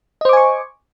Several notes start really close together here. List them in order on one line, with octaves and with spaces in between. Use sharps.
D#5 C5 D6 G#5 C#6